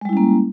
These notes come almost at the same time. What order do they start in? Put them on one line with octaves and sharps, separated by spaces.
G#3 G3 E4 C#4 A#3